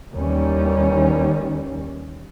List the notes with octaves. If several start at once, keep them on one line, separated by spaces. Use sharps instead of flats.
D#2 D#3 E3 G3 C#4